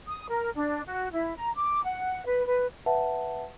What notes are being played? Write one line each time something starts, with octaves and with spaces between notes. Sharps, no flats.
D#6
A#4
D4
F#4
E4
A#5
D6
F#5
B4
B4
B4 E5 F#5 A5